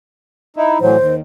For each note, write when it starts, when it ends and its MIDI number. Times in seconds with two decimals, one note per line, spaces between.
0.56 0.78 63
0.56 0.78 64
0.81 0.96 45
0.81 0.96 52
0.81 0.96 54
0.81 1.15 72
0.97 1.21 39